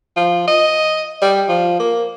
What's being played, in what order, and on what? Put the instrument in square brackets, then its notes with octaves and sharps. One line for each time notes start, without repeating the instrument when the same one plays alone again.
[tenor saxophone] F3
D#5
G3
F3
A#3